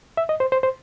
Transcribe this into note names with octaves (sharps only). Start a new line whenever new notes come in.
E5
D#5
C5
C5
C5